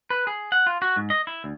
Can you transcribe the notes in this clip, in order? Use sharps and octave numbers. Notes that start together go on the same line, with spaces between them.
B4
G#4
F#5
F4
F#4
G#2
D#5
E4
D2